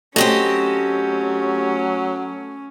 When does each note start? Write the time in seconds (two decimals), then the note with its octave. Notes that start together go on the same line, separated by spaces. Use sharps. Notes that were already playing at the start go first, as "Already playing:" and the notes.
0.16 F#3 A3 C4 C#4 G4 D#5